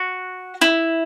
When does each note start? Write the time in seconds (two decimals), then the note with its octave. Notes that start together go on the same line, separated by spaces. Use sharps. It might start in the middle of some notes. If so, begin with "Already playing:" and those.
Already playing: F#4
0.61 E4